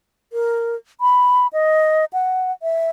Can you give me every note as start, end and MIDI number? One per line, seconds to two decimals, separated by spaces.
0.33 0.76 70
1.01 1.47 83
1.53 2.05 75
2.13 2.52 78
2.62 2.90 76